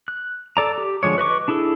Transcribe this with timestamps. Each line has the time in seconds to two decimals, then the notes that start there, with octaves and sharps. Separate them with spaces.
0.08 F#6
0.57 A4 D5 A#5
0.78 G4
1.03 D3 F3 G#3 C#5
1.18 B4 D#5 C#6 D6
1.48 D4 E4 G#4 A4